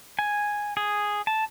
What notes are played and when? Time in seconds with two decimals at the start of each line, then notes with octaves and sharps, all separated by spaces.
0.19 G#5
0.77 G#4
1.27 A5